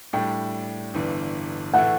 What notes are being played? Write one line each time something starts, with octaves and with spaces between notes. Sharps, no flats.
A2 G3 D4 G5
G1 G2 E3
A2 E3 A3 F#5